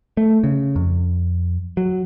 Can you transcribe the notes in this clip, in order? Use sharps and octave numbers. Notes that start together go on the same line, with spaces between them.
A3
C#3
F2
F#3